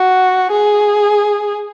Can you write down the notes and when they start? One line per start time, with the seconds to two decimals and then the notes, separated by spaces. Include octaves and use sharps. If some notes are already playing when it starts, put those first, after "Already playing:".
Already playing: F#4
0.51 G#4